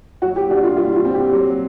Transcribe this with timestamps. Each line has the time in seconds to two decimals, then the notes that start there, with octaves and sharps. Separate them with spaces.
0.22 F#3 F#4
0.36 G4
0.50 D4 F#4
0.64 F4
0.77 G3 F4
0.96 F4
1.05 C4
1.14 G4
1.32 F#3